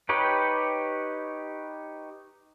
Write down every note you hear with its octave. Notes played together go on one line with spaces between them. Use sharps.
D#4 G4 B4 C#5 G5